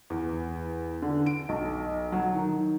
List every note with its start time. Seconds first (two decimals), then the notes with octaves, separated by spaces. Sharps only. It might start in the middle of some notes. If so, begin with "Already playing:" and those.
0.10 E2
1.02 D3
1.26 D7
1.49 B1
2.12 F#3
2.34 D#3